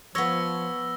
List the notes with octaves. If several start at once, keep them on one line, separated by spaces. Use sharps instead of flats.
F3 B3 C#5 E6 A#6 G7